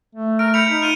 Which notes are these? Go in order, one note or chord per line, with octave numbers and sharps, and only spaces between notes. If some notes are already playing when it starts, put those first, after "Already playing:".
A3
A#4 D7
B5 G6 C#7 F7
D#4
F4 F6 D#7 G7